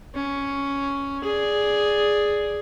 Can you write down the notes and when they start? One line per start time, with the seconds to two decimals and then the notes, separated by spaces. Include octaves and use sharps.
0.15 C#4
1.24 G#4 D5